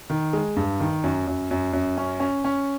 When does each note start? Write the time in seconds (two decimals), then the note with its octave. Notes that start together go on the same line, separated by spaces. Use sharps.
0.10 D#3
0.33 G#3
0.56 G2
0.80 D#3
1.04 F#2
1.27 F#2
1.51 F#2
1.73 F#2
1.97 C#4
2.20 C#4
2.44 C#4